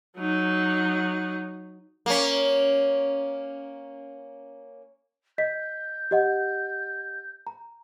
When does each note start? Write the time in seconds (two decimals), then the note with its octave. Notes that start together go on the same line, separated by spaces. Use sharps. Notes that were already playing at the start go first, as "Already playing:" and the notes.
0.18 F#3 D#4
2.06 A#3 C#4
5.38 D#5 G6 B6
6.11 G4 D#5 F#5
7.47 A#5